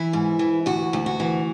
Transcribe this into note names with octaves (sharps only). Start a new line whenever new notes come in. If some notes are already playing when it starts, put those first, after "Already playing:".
Already playing: E3 E4
G#2
E3
D2 F#4
D2
F#4
E3